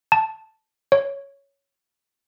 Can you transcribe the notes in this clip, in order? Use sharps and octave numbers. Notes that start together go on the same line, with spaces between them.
A5
C#5